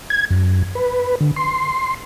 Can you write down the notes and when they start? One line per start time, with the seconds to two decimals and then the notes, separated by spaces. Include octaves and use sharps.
0.10 G#6
0.30 F#2
0.75 B4
1.21 D3
1.36 C6